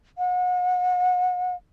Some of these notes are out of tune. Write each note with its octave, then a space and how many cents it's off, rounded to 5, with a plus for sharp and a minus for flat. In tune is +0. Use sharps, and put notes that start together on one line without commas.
F#5 -35